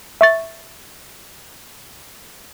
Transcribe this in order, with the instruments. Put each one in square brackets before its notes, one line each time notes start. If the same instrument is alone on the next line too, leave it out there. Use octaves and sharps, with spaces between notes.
[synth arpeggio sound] E5 C#6 A6